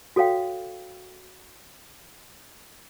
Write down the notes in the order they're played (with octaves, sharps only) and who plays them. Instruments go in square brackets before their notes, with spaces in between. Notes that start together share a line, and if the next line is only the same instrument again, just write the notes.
[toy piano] F#4 A4 C#5 F5 G5